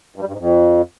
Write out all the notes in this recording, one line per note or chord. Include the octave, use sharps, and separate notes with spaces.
G2
G3
G2
G#2
F2